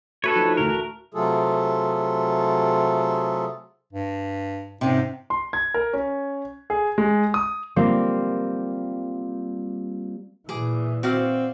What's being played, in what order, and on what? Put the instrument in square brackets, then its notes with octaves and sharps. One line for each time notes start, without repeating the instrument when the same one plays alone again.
[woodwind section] A3 D4 F#4 [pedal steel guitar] A4 B4 C#5
[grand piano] F3 D#4
[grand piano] D2 A2 E3 [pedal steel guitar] A#4
[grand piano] A5
[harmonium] C3 F#3 A3 F4 G#4 A4
[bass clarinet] G2
[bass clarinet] G#2 [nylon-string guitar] C3 C#4
[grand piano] C6
G#6
A#4
C#4
G#4
G#3
D#6
[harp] G3 A#3 C4 F4
[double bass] A#2 E3 [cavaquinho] G#4 D6
[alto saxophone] C4 [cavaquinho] F#4 D5 F5